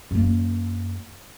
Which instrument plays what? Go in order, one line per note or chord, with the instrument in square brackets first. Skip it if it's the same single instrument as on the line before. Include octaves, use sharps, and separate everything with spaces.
[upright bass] F#2 A#3